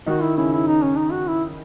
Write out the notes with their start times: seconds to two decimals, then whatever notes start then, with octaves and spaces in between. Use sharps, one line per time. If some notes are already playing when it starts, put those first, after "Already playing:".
0.06 D#3 D#4 F#4
0.22 E4
0.37 C#3 C#4 E4
0.52 E4
0.67 D#4
0.83 C#4
0.97 D#4
1.12 F#4
1.27 E4